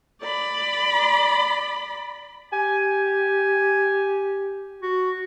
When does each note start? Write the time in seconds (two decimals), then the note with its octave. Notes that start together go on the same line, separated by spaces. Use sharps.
0.23 D5 B5
2.53 G4 G#5
4.82 F#4